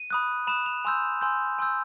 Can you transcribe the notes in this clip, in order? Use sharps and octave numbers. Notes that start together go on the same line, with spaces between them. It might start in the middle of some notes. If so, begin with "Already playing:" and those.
Already playing: D#7
B5 D#6 F#6
B5 D#6 F#6 E7
F7
G#5 C6 E6 G6 F7
G#5 C6 E6 G6
G#5 C6 E6 G6